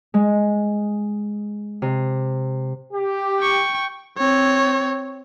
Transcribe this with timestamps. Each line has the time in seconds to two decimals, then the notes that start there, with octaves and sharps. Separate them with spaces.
0.14 G#3
1.82 C3
2.92 G4
3.40 G5 C#6
4.18 C4 C#5